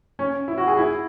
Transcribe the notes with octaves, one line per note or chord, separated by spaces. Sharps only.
C#4
E4
F#4
G#4
E4